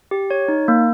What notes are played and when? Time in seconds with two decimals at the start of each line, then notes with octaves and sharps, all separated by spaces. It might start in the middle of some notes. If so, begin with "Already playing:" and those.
0.11 G4
0.30 C#5
0.48 D#4
0.68 A#3